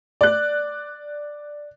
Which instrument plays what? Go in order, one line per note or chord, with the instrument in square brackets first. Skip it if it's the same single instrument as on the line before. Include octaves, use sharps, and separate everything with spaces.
[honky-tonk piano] D5 F#6